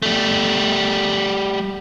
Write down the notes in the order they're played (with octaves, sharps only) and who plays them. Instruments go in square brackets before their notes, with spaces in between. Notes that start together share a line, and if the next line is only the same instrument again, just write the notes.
[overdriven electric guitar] G3 A3